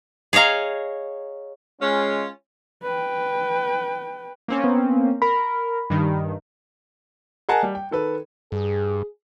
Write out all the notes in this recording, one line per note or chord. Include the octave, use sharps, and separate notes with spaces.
G#4 C#5 D#5 F5 A#5
G#3 C#4 F4
B4 G5
A#3 C4 C#4
B3
A#4 B5
G2 D#3
G#4 A#4 D#5 F#5 G#5 A5
G3
G5
D#3 A4 B4
G2 G#4